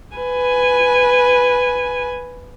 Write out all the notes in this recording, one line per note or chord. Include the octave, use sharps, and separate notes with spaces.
B4 G#5